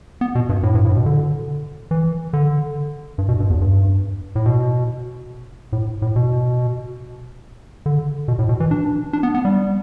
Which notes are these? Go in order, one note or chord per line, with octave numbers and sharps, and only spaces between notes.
B3
B2
G2
A2
G2
A2
B2
D3
E3
D3
G2
B2
G2
E2
G2
A2
B2
A2
A2
B2
D3
B2
A2
B2
E3
D4
D4
B3
B3
G3